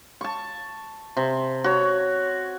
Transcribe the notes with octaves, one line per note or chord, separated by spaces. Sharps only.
A5 C#6
C3
F#4 C#5